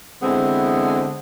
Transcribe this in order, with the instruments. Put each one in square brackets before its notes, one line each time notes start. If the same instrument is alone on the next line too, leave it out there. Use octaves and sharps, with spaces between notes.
[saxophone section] D3 E3 G#3 B3 C4